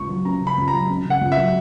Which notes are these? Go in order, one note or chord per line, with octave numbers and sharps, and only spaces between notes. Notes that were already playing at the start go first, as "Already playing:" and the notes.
Already playing: C#2 C#6
F#3
C#4 A#5
C#3
B5
C#2
A#5
F#3
C#4
C#3
F#5
C#2
E5
F#3